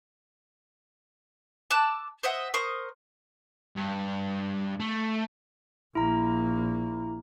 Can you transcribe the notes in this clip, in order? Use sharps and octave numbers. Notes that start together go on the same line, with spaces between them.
A5 D6 E6 F#6
C5 D#5 E5 F#5
A#4 C5 C#6 D#6
G2
A3
A#1 A#3 E4 A#5